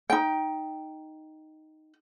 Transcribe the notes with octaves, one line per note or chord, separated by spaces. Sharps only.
D#4 G5